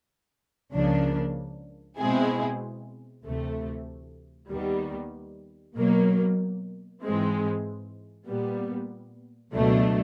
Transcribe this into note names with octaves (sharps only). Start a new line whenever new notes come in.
C#2 C#3 F3 A#3 D4
B2 G#3 C4 E4 G#4
D2 C3 E3 A3
D#2 D#3 G3 B3
B2 F#3 A#3
G#2 E3 G#3 C4
A#2 G3 B3
C#2 B2 F#3 A3 D4